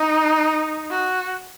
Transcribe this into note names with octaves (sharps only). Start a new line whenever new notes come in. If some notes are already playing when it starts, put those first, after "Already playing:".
Already playing: D#4
F#4